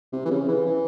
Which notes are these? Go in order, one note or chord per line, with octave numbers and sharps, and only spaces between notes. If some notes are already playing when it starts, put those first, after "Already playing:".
C3
E3
C#3
E3
E3